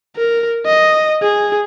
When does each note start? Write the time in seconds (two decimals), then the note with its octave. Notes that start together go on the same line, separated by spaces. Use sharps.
0.16 A#4
0.66 D#5
1.22 G#4